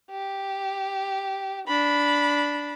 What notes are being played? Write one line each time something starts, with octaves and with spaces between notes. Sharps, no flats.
G4
D4 B5